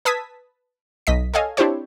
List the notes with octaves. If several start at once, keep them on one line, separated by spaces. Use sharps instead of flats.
B4 A5 D#6 E6 G#6 B6
B1 D#5 B6
A4 C#5 D#5 F5 G#5
C4 D4 E4 G4 C5 C#5